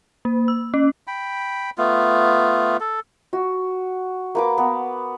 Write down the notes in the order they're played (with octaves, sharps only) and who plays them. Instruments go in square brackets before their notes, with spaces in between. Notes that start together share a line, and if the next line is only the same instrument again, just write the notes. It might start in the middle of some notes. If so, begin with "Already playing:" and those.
[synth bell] A#3
E6
C#4
[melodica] G5 B5
A3 B3 F4
A4
[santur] F#4
A#3 B4 D6
B3